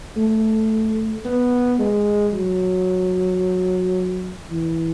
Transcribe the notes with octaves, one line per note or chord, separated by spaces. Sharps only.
A3
B3
G#3
F#3
E3